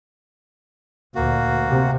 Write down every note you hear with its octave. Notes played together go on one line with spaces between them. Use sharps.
D2 A#2 A#3 F#4
C3